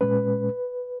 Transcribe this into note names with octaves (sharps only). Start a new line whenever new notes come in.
A#2 G#3 C#4 B4